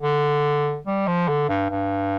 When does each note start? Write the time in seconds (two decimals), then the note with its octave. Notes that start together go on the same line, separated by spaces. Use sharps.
0.03 D3
0.87 G3
1.07 F3
1.29 D3
1.49 G2
1.70 G2